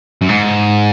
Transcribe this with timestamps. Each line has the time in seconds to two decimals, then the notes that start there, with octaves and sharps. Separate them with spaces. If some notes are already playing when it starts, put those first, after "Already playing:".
0.22 F#2
0.29 G#2